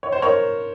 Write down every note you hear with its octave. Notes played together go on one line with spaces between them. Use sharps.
C#5
C5
A#4 C#5